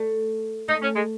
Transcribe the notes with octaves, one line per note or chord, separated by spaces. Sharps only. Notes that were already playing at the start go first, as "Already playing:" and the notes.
Already playing: A3
A3 D#4
C#4
G#3